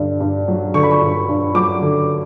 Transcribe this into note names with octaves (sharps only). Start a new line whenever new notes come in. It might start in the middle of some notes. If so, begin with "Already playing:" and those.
Already playing: G2 D3
G2
F#3
D3 C#6
B5
C#6
G2
G2
F#3 D6
D3